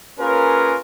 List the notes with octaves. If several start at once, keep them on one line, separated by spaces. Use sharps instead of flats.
A#3 C#4 F4 G#4 A#4 B4